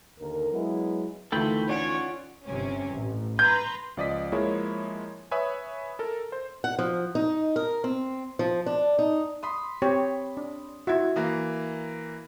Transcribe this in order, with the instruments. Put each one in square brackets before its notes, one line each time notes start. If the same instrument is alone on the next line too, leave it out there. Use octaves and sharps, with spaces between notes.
[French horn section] D#2 D3 A#4
F#3 G#3 B3 E4
[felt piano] D2 D#3 E3 [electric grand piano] A3 F4 [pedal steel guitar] A4 G5 B5
[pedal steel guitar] C#4 F4 [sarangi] C#5 [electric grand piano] D5 F#5 D7
[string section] G1 C3 C#4
A1
[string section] B4 A#5 C6 [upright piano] G6
[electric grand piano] C#2 F3 D5 D#5 D#6 B6
F3 G#3 A#3 E4 G#4 C#5
B4 C#5 E5 G#5 B5 D#6
A4 A#4
C5
[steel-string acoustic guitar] F#5
F3
D#4
A#4
C4
F3
D4
D#4
[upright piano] B5 C6 D#6
[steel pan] C4 G4 C#5
D4
[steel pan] E4 F#4 [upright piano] E5 G#6
[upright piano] E3 A#3